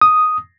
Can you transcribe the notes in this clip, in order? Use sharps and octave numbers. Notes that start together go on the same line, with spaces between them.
D#6